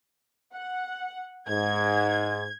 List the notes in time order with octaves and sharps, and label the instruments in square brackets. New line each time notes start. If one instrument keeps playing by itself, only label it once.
[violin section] F#5
[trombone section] G#2 [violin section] G#6